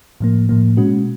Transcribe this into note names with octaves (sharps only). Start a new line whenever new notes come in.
A2 F3 A#3
A2 F3 A#3
B2 G#3 C#4 F#4